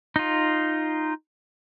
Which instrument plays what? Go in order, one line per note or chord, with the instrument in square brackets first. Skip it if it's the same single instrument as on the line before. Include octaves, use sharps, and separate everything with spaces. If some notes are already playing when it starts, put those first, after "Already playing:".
[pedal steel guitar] D#4 F4